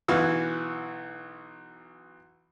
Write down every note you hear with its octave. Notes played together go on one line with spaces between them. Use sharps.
B1 E3 F#4 F5 E6